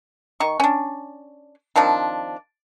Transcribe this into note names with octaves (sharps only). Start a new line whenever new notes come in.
D#3 C#6
C#4 D4
D#3 F3 C4 D4